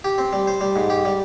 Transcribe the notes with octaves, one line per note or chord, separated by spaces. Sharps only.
G4
C4
G3
C5
G3
G#2
G4
G3